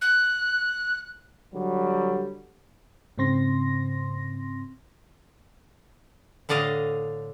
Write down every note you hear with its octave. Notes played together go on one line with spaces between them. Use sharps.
F#6
D3 F#3 G3
G#2 C#3 C4 C6 A#6
A2 D3 D5 D#5 F5